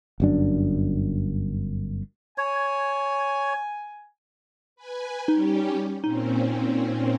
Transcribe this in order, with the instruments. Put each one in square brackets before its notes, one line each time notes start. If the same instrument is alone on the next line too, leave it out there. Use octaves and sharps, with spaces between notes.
[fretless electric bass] G1 F#2 D4
[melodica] C#5 [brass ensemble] G#5
[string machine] B4 G#5
[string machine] G3 C#4 G4 [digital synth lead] D#4
[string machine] A#2 C4 C#4 [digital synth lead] D#4